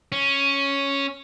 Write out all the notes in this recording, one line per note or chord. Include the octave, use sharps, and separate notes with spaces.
C#4